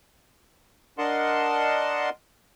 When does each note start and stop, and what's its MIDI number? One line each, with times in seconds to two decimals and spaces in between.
0.98 2.10 62
0.98 2.10 70
0.98 2.10 75
0.98 2.10 78
0.98 2.10 81
0.98 2.10 84